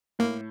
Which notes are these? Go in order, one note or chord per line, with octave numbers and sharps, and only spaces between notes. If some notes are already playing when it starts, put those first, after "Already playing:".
A2 A#3